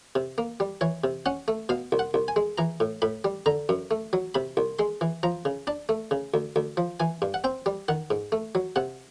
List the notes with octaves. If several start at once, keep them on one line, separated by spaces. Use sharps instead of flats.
C3
A#3
G3
E3 C#5
C3
C#4 F#5
A3
B2 F5
C2
F#5
C2
G#5
G#3
E3 A#5
A2
A2 B5
G3
D3 A#5
F#2
A3
F#3
C3 B5
C2
G#3 C6
E3
F3 A#5
C#3
D4 A5
A3
C#3
D2
D2
F3
E3 G#5
G2
F#5
C4 G5
G3
D#3 F#5
G#2
A3
F#3
C3 F#5